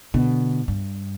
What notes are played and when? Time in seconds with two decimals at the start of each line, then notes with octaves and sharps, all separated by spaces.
0.14 B2 D3
0.68 G2